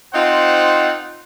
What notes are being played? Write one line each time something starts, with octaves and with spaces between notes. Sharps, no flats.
C4 D#4 F4 C5 F#5